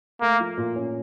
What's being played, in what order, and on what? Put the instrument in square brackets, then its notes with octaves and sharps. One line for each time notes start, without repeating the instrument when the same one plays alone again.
[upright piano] A3 [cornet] A#3
[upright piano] F3
A#2
C#4